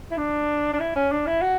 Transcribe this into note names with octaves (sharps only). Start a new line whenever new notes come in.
E4
D4
D4
E4
C#4
D4
E4
F#4